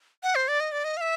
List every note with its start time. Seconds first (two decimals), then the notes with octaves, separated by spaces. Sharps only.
0.23 F#5
0.35 C5
0.48 D5
0.60 D#5
0.72 D5
0.84 D#5
0.97 F5
1.01 E5